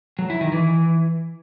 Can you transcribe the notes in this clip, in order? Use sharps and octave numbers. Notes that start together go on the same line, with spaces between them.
F#3
E4
D#3
E3